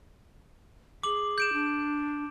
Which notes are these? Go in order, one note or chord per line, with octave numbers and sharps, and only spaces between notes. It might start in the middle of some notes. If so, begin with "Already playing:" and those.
G#4 D6 F#7
G6 D7 E7
D4